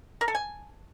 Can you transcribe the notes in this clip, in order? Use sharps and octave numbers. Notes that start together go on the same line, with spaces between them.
A#4
A4
G#5